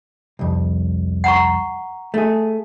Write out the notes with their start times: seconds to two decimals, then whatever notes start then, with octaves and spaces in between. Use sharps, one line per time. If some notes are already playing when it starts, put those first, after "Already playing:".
0.39 C2 F2
1.24 F#5 A#5 C#6
2.14 A3 G#4